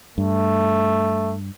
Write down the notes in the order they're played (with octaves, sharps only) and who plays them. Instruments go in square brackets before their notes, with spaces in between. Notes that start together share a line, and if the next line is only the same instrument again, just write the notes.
[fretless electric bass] G2 [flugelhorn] A3